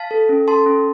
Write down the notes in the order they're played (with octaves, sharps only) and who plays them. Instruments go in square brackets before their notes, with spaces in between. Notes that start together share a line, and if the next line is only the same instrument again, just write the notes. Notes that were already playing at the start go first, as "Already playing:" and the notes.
Already playing: [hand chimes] F5 A5
A4
C#4
A4 A5 C6
C#4